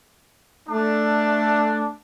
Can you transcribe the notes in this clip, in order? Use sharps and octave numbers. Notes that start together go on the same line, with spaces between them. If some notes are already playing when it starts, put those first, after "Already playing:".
A3 D4